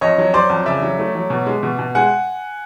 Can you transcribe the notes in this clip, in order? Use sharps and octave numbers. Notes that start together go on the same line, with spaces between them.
F2 C#5 D#5
F#3
F#3 C5 D5
F2
C#3 D5 E5
F#3
A3
F#3
B2
G#3
B2
B2
G#3 F#5 G#5